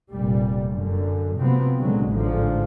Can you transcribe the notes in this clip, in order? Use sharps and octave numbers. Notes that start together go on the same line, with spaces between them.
F1 A#2 G3
F#2 D3
C3 F3 F#3 B3 C4
C#2 A#2 D3 F#3 G#3
A1 G#2 D3 F3